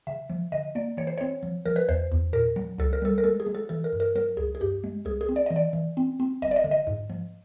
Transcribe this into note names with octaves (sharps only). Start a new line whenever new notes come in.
C#3 E5
F3
D3 D#5
A#3 D5
E3 C#5
C5
C4 C#5
F3
F3 A#4
B4
E2 C5
E2
A#2 A#4
F#3
C#2 A4
A#4
G3 A4
A#4
G#3 A4
G#4
G#3
A4
E3 A4
A#4
G2
A#4
F#3 A#4
C#2 G#4
G#4
G2 G4
G#3
C2 G#4
G#4
C4
D5
E3 D#5
D5
E3
C4
C4
G1 D#5
D5
D#5
D3
D#5
G#2
F3